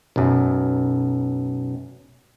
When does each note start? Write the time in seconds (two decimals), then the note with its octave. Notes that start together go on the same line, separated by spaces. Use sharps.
0.16 B1 F#2